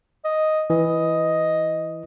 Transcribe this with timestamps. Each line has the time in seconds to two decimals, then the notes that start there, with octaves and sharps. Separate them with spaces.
0.24 D#5
0.70 E3 D#5